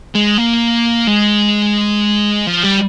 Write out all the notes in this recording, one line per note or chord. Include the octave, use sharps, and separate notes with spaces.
G#3
A#3
G#3
F3
G3